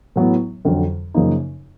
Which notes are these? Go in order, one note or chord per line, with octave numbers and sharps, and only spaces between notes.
A2 F#3 B3
F2 D3 F#3
F#2 C#3 F3 A#3 D#4